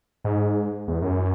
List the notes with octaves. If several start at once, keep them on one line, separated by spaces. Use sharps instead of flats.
G#2
E2
F#2